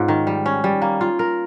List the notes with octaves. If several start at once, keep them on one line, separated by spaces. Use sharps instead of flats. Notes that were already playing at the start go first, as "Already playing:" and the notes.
Already playing: G#2 G#3 C#4 F4
D#3
G3
C#4
G3
A#3
F4
A#4